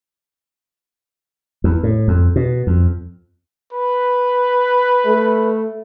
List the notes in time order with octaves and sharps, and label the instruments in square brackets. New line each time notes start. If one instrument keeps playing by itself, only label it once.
[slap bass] E2
A2
F2
B2
F2
[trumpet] B4
[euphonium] A3